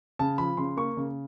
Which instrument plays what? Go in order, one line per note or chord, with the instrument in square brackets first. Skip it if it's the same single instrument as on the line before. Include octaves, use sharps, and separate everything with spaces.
[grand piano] C#3 A5
F3 B5
C#3 C6
A#3 C#6
C#3